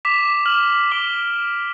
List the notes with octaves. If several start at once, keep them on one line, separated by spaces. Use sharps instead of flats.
D6 B6 E7 F7
F6 F#7
D6 D7 G7